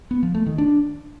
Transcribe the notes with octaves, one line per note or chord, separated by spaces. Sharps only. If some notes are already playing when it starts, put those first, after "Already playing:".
B3
F3
A3
D#3
D4